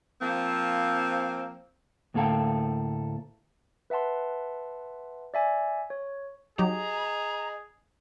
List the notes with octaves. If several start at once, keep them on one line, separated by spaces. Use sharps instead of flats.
F3 A#3 C4
D2 A2 A#3 A4 F5 G5
B4 E5 F#5 A5 C6
D5 E5 G#5
C#5
F#3 D#4 G4 G#4 D#5 A#5